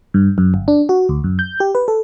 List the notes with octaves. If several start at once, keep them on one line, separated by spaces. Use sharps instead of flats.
G2
F#2
G1
D4
F#4
D2
F#2
G6
G4
B4
A4